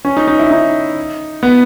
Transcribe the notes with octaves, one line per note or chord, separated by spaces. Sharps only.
C#4
D#4
D#4
E4
D#4
B3